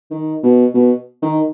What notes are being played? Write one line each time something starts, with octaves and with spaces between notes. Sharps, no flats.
D#3
B2
B2
D#3